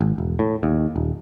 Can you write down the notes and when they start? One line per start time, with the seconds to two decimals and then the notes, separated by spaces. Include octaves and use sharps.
0.01 G#1
0.18 E1
0.39 A2
0.63 D#2
0.96 D#1